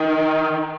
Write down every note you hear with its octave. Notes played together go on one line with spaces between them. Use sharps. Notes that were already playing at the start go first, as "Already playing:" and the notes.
Already playing: D#3